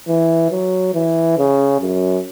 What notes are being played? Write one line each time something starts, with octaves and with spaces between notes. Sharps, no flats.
E3
F#3
E3
C#3
F#2